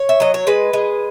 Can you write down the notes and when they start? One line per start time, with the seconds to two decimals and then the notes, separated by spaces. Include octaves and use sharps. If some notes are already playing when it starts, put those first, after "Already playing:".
Already playing: C#5
0.09 E5
0.20 F#3 D#5
0.34 C#5
0.47 G#3 B4
0.73 G#3